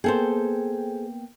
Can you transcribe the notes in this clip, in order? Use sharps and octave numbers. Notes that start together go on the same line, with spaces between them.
A#3 B3 G#4 A4 C5 G5